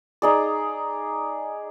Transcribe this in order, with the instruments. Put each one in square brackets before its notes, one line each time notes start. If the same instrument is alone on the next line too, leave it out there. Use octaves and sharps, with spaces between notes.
[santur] D#4 G#4 D5